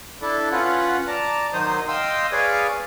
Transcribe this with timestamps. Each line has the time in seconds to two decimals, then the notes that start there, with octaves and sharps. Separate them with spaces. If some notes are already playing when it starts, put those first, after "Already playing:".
0.22 D4 E4 A4
0.52 C#4 F4 B4 F#5
1.08 D5 A5 A#5
1.53 D#3 F#3 D#4 C5 D#6
1.88 D#5 F5 G5 C6 D#6 E6
2.32 G#4 B4 C#5 D5 F5 G#5